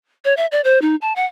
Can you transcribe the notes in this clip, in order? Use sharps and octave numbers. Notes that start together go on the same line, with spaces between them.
C#5
E5
D5
C5
D#4
A5
F#5